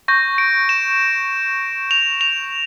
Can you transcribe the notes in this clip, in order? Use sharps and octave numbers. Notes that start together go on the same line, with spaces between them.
C#6 G6 A#6
D7
E7
F7
F7